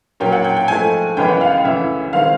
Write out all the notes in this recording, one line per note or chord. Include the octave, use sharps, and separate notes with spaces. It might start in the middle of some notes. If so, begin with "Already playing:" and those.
A#2 F#3 A#3 C#4 G5
F#5
G5
G5
G#2 F3 A3 G#5
F#2 C#3 E3 G#3 B3 G5
F#5
F5
D2 C#3 E3 E5
D#3 G#3 C4 F5